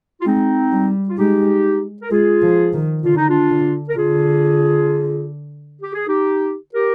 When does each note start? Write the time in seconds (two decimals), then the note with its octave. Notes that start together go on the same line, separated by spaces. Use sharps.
0.21 F4
0.26 G#3 C4 D#4
0.72 G3
1.09 F4
1.18 G#3 D#4 G4
2.02 A#4
2.11 G#3 F4 G#4
2.42 F3
2.73 D#3
3.04 D3 F4
3.16 D#4
3.29 D4 F4
3.50 D3
3.89 A#4
3.96 D3 F4 G#4
5.82 G4
5.94 G#4
6.07 D#4 G4
6.74 G4 A#4